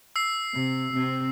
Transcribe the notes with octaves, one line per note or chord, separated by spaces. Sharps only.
E6 C7
C3
C3 C4